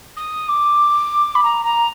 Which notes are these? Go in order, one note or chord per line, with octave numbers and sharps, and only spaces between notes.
D#6
D6
B5
A#5
A#5